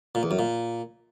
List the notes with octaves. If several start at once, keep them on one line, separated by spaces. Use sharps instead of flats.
A#2
E2
F#2
A#2